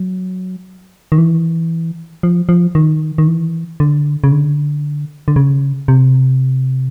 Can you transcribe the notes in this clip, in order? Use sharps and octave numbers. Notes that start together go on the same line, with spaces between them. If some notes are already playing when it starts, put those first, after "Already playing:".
Already playing: F#3
D#3
E3
F3
F3
D#3
D#3
E3
D3
C#3
D3
D3
C#3
C3